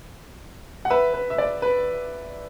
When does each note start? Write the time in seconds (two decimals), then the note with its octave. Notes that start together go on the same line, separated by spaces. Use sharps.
0.85 F#5
0.90 B4 E5
1.14 B4
1.30 E5
1.38 D5
1.62 B4